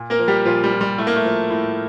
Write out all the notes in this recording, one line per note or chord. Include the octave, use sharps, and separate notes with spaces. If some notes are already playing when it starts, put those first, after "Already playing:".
Already playing: A#2
A#3 A#4
F3
G3 G4
A#2 F3 F4
G3
F3
G3
A2 A3
A#3
A3
F3
A2